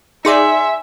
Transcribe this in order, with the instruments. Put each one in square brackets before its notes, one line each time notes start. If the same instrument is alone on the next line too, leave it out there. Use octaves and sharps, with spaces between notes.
[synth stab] D#4 G#4 D5 [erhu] E5 [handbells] G#5 C6 C#7